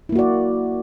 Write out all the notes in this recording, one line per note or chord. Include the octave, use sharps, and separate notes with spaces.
A#3 E4 F#4 D5